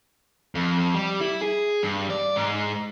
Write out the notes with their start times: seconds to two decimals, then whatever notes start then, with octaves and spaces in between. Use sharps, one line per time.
0.55 F2
0.94 G3
1.21 E4
1.42 G#4
1.83 G2
2.10 D5
2.36 G#2